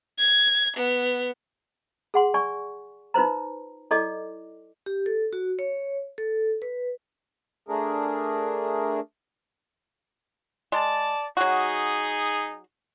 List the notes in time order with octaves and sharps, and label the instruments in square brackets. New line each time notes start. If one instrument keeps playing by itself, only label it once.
[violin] G#6
B3
[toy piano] G#4 F#5 C6
D5 G#5 C#6
D#4 F4 B4 C5 A#5
E4 A4 D5 D#5 D6
[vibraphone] G4
A4
F#4
C#5
A4
B4
[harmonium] A3 D4 G#4 A#4
[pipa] G#3 [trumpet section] D5 A5
[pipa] F#3 F#4 [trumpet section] D#4 G#4